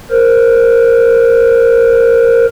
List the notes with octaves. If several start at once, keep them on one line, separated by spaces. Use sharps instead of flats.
A#4 C5